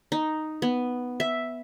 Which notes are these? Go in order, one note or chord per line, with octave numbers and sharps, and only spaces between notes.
D#4
B3
E5